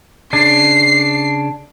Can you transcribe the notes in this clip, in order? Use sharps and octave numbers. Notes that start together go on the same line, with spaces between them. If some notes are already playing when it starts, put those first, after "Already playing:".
C#3 D4 C7